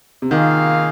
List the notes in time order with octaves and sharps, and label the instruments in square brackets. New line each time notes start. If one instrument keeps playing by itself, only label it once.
[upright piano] C3
[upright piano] D#3 [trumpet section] A#3 F4 G#4 F5